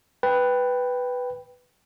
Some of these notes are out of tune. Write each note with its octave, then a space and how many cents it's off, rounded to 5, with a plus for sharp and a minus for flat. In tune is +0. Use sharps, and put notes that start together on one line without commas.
B4 +0 G5 +0